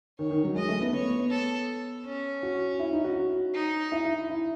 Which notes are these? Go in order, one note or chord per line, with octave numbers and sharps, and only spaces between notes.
D#3 C#5
D#3
F#3
G#3 D#5
A3
B3
B3 C#5
A4
C#4
F#4
E4
D#4
F#4
D#4
E4
E4
E4